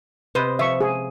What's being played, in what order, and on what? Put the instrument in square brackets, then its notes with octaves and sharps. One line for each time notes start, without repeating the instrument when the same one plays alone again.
[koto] C3 C5 D#5 [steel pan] B4
[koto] F3 [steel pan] E5 C#6
[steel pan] G#4